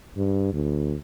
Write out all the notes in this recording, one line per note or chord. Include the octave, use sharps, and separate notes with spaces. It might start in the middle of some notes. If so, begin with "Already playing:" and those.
G2
D2